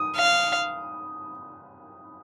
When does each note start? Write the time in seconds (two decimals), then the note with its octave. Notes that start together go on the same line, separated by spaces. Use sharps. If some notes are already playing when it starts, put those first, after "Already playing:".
Already playing: D#6
0.16 F5